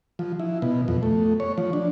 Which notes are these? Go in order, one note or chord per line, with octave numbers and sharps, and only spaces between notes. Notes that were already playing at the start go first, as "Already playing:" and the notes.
F3
E4
B2
F2
A3
C#5
F3
D4